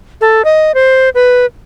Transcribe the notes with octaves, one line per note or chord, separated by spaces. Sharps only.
A4
D#5
C5
B4